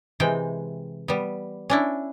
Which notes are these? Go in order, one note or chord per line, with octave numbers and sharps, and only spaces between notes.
C3 E3 G#3 G5
G3 B3
C#4 D4 E4